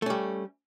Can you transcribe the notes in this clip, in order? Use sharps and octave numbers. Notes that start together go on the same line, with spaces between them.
G3 A3 C#4